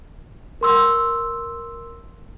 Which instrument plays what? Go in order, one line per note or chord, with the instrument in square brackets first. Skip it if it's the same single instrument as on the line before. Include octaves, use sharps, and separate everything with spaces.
[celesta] A#4 C6 E6